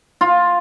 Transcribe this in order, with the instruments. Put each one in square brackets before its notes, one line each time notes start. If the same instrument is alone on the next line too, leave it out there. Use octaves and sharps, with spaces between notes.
[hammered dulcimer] F4